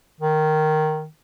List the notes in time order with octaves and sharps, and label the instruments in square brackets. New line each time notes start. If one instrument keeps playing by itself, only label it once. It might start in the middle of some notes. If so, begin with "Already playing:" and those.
[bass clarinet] D#3